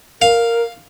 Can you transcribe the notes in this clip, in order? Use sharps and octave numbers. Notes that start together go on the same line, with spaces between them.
A#4 F5